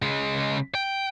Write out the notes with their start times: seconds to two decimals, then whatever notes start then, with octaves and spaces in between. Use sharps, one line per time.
0.02 C#3 G#3
0.75 G5